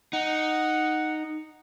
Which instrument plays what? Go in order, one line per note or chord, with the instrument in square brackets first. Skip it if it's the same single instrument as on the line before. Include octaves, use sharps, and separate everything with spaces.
[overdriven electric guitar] D#4 [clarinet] F#5